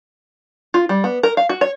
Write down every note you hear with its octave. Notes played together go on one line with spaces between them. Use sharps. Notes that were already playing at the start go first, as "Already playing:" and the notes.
F4
G3
B3
A#4
F5
F#4
C#5